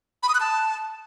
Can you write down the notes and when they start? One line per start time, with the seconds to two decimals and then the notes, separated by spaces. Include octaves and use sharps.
0.23 B5
0.29 D#6
0.35 F#6
0.40 A5